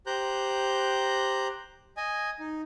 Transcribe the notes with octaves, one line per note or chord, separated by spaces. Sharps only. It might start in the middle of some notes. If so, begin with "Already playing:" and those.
G4 C5 A#5 F#6 G6
D#5 G#5
D#4